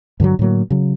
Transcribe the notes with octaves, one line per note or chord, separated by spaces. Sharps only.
G2 D3 F3 F#3
A2 D3 F#3 A#3
C#3 F#3